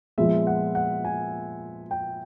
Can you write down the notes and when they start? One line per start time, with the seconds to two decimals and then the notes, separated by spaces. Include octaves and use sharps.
0.18 A#2 F3 G#3 B3 E5
0.47 F#5
0.75 F#5
1.05 G#5
1.91 G5